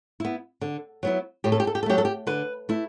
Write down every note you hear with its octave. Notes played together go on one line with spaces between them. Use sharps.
B3 E4
D3
F#3 B3 E4
A2 G4
A4
G4
A4
G4
A4
F#3 A3 G4
A4
G4
D3 B4
A3 E4